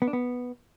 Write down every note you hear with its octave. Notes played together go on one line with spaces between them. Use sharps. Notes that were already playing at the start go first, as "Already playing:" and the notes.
B3
D4
B3